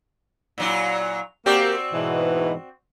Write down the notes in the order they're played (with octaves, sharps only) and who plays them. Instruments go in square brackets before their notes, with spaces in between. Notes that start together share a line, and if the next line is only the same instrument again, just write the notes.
[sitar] A#2 F#3 E4
[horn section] A#3 G4 [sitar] C4 F#4 D5
[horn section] G#2 B2 E3